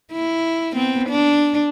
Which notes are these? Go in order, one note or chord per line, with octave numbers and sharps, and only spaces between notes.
E4
B3 C4
D4